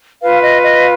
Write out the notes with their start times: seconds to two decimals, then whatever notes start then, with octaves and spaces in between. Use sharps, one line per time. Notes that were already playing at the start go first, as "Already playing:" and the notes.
0.22 F4 B4 F5
0.42 D#5
0.63 D#5